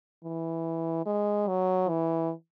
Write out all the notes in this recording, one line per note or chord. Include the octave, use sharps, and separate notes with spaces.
E3
G#3
F#3
E3